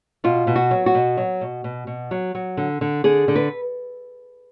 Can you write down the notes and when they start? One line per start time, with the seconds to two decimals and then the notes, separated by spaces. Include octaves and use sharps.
0.24 B2 F4
0.47 B2
0.56 F#4
0.71 F#3
0.86 F#4
0.95 B2
1.17 F#3
1.41 B2
1.64 B2
1.87 B2
2.11 F#3
2.35 F#3
2.57 D3
2.81 D3
3.04 D3 G#4
3.28 D3
3.36 B4